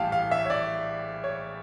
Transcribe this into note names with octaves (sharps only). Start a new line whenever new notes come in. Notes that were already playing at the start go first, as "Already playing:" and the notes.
Already playing: A#1 A2 E3 G3 F5 G5 A5
F5
E5
C#5
D5
C#5